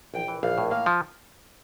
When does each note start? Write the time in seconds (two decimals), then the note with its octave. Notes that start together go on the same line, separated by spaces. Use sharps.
0.14 A#1 G5
0.28 E3
0.43 A#1 F5
0.58 A2
0.71 A#3 F5
0.86 F3